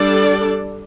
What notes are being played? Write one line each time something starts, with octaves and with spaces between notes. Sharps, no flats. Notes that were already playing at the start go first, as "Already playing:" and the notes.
Already playing: G3 D4 A4 D5